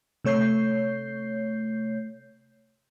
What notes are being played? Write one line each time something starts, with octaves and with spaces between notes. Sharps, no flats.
C3 A3 C#5 G6 C7